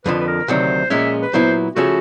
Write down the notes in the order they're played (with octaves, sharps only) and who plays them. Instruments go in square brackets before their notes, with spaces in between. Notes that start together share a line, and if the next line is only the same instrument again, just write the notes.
[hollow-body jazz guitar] F2 D3 F3 [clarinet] B4
[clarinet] B4
A#4
[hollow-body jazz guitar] D2 C3 D#3 F#3 [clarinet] C5
[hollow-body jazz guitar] A#2 F3 G#3 C#4 [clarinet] E5
[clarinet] B4
[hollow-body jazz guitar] A#2 F#3 B3 E4 [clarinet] C5
[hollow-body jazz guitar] C#3 F3 A3 C#4 [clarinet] F#4